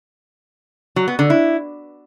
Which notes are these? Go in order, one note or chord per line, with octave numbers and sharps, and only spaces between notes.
F#3
B3
D3
E4